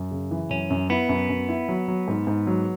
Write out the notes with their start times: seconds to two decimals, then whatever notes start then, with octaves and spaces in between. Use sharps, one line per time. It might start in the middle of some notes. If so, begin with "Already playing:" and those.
Already playing: F#2
0.11 C#3
0.31 E3
0.50 F#2 C#4
0.70 F#2
0.90 B3 E4
1.09 F#2
1.29 F#2
1.49 E4
1.69 F#3
1.88 F#3
2.08 G#2
2.27 G#2
2.47 F#3